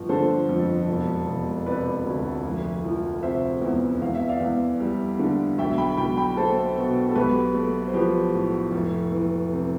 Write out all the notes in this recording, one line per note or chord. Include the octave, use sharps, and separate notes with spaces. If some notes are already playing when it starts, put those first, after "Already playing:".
Already playing: G1 F3
D3 A4 C5
F2
E1
E1
C3 B4 D5
D2
F1
F3
C3 C5 E5
E2
E2 F5
E5
D5 F5
E2
G3
D3
B1 E5 G5
G5 B5
B1 G5 B5
G5 B5
A3 A4 C5
B2
A4
B1 G4 B4
A3
C5
F3 G4 B4
A2
F1
E3
C3